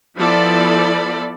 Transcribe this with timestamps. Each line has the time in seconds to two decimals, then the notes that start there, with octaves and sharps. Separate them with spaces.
0.17 F3 B3 E4 A4 D5 B5